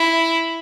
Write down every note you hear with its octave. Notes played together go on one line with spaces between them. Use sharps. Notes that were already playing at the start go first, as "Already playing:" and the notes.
Already playing: E4